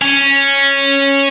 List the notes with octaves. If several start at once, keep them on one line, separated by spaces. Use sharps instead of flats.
C#4